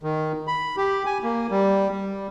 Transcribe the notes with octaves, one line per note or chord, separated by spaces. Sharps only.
D#3
B5
G4
G#5
A#3
G3
G3